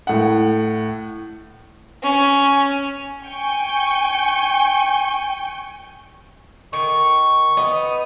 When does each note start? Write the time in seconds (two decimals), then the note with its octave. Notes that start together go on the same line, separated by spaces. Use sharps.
0.07 A2 F#5
2.03 C#4
3.24 G5 G#5 C#6 G6
6.73 D#3 C#6
7.57 B3 D#4